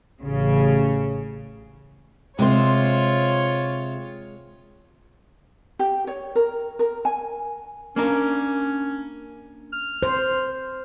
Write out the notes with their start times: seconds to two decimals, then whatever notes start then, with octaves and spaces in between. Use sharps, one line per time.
0.21 A1 C#3
2.39 C3 G#3 C4 F4 C5 C#5
5.79 G4
6.07 C#5
6.35 A#4
6.79 A#4
7.05 G#5
7.96 A#3 C#4 D4 A#4
9.73 F6
10.03 C5